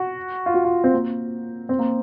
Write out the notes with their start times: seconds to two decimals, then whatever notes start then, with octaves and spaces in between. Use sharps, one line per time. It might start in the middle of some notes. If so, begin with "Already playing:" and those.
Already playing: F#4
0.46 F4
0.54 F#4
0.64 F4
0.84 C4
0.93 A#3
1.69 C4
1.79 A#3